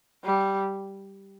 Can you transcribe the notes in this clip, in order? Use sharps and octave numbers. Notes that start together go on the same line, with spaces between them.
G3